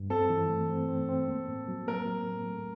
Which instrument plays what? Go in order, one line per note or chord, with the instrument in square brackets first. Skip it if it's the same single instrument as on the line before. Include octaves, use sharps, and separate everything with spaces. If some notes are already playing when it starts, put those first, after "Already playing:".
Already playing: [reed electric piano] G2
[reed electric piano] C4 [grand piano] A4
[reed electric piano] E3
A3
C4
C4
C4
A#3
A2
F#3
[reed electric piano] A#3 [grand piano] A#4
[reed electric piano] A#3
A2
A3